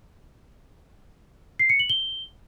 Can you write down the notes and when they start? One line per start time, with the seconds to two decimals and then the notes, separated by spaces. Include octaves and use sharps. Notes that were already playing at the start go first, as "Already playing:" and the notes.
1.59 C7
1.69 C#7
1.80 F#7
1.90 G7